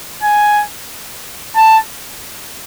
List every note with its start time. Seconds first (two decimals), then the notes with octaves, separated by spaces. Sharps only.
0.23 G#5
1.56 A5